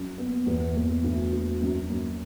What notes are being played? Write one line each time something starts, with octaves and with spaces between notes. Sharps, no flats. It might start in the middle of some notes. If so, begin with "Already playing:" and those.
Already playing: F#2
B3
E2
E2
D2
D2
F#2
F#2